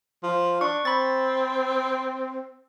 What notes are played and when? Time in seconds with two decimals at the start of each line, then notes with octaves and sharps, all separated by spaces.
0.23 F3
0.61 D4 C#6
0.85 C4 B5 A6